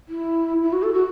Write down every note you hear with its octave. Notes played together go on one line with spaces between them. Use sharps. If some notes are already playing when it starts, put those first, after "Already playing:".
E4
E4
F#4
A4
F#4